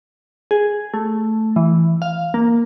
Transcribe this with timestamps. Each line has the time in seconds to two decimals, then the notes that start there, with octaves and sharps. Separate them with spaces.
0.51 G#4
0.94 A3
1.56 E3
2.02 F5
2.34 A#3